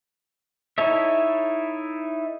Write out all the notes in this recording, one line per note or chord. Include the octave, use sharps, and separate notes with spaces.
D#4 E4 A4 C#5 E5